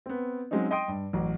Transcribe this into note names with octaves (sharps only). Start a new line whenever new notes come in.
B3 C4
F#3 G#3 C4 C#4 D#4
D#5 G5 C6 D#6 D7
G2
A1 F#3